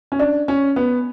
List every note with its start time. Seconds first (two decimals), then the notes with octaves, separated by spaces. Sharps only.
0.12 C#4
0.19 D4
0.48 C#4
0.76 B3